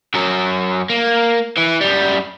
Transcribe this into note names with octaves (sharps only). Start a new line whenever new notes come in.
F#2 F#3
A#3
E3
F#2 G3